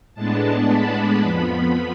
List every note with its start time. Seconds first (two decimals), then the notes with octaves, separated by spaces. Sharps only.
0.14 A2 G#3 B3 D4 A5
0.68 B5
1.21 F2 F3 B3 B5